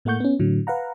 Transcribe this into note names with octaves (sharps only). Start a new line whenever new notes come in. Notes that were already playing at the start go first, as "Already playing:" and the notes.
A2 A3 A#3 F#5 C#6 G6
B3 C#4
A2 D3 F#3
B4 F5 F#5 A#5